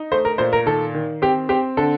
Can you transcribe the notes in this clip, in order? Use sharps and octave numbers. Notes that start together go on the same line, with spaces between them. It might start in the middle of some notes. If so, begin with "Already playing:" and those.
Already playing: D#4
A3 C5
A#4
A#2 C5
A#4
D#3 A4
D#3
C4 G4
C4 G4
D3 A4